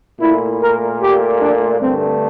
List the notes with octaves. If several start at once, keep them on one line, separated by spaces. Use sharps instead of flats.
A#2 A3 E4
A#4
G4
D4
G2 D3 A3 C4